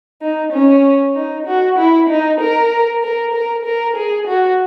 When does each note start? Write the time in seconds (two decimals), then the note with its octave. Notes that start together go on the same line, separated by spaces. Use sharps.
0.22 D#4
0.53 C#4
1.15 D#4
1.47 F#4
1.78 E4
2.09 D#4
2.40 A#4
3.03 A#4
3.34 A#4
3.65 A#4
3.97 G#4
4.27 F#4